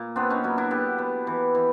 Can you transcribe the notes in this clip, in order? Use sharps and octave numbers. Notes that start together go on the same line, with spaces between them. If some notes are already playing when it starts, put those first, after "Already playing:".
Already playing: A#2
B3 C4 D4
C#4 D#4
F#3 D4 E4
D4 E4
B3 G4 A4
B3
E3
E3